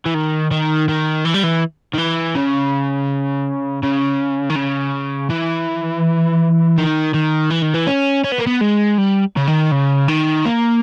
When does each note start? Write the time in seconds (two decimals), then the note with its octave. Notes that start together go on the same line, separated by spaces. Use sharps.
0.06 E3
0.15 D#3
0.51 D#3
0.88 D#3
1.25 E3
1.34 G3
1.43 E3
1.94 D#3
1.99 E3
2.36 C#3
3.83 C#3
4.50 D#3
4.56 C#3
5.30 E3
6.78 D#3
7.14 D#3
7.51 E3
7.62 D#3
7.74 E3
7.87 C#4
8.24 C#4
8.32 B3
8.39 A#3
8.47 B3
8.61 G#3
8.98 G3
9.37 C#3
9.47 D#3
9.71 C#3
10.08 D#3
10.46 A#3